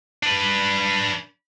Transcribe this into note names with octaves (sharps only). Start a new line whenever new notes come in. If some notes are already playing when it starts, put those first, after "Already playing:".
D4 B4